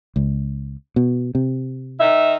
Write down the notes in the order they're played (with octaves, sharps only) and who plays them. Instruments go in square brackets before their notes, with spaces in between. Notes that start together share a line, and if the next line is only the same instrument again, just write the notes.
[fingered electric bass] C#2
B2
C3
[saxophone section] D#3 D#4 E5